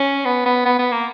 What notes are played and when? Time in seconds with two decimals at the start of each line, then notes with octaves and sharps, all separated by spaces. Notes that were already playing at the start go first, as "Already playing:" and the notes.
Already playing: C#4
0.25 B3
0.45 B3
0.65 B3
0.79 B3
0.92 A#3